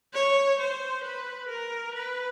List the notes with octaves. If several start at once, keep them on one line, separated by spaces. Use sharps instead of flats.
C#5
C5
B4
A#4
B4